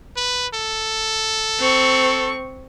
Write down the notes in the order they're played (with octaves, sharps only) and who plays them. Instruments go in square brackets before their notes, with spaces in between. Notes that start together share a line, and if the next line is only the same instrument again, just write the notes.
[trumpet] B4
A4
[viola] C4 C#6